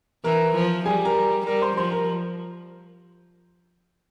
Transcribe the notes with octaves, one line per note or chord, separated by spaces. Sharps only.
E3 A#4 A#5
F3
G3 G#4 G#5
A#4 A#5
G3 A#4 A#5
C5 C6
F3 C5 C6
A#4 A#5